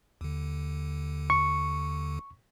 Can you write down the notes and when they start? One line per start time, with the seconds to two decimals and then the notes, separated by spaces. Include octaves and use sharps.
0.21 D#2 D3
1.30 C#6